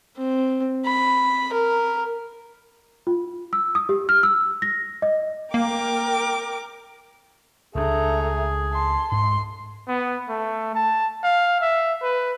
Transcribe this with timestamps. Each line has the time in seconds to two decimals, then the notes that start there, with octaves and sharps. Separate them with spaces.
0.17 C4
0.86 B5
1.53 A#4
3.07 F4
3.53 E6
3.75 D#6
3.89 G4
4.09 F6
4.23 E6
4.62 A#6
5.02 D#5
5.54 A#3 A#4 G5 D6
7.75 C#2 G3 A3 D4 G#4 A#5
8.71 A5 C6
9.12 G#2 C6
9.88 B3
10.29 A3
10.75 A5
11.24 F5
11.61 E5
12.03 B4